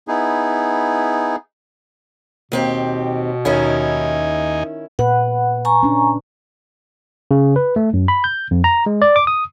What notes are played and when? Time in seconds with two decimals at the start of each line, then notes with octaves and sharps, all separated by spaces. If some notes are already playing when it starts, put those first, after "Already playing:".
0.08 B3 D#4 E4 G#4
2.52 D#2 B2 C4 G4
3.45 D#2 D#3 C#4 D#4 E4 G#5
4.99 A#2 B4 F#5
5.65 G#5 A#5 C#6
5.83 C#4 D4
7.31 C#3
7.56 B4
7.76 A3
7.94 F#2
8.08 B5
8.24 G6
8.51 F2
8.64 A#5
8.86 G#3
9.02 D5
9.16 D6
9.27 D#6